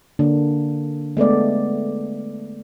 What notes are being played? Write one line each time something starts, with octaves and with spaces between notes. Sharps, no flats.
D3 A#3 D4
G#3 A3 B3 D5